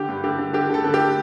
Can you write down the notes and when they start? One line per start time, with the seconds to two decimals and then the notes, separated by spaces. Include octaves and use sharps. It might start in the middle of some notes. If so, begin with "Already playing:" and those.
Already playing: D3 G4
0.08 G2
0.24 D3 G4
0.38 D3
0.53 D3 G4
0.69 D3 A4
0.84 D3 A4
0.94 G4